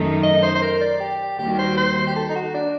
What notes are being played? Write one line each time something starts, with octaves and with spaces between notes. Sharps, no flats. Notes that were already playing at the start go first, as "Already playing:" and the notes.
Already playing: F#2 D#3 A3 D#4
D#5
C5
C5
A#4
D5
G4
D#2 D#3 G3 A#3 F#4 G4
C5
C5
G4
A4
D#4
F#4
D4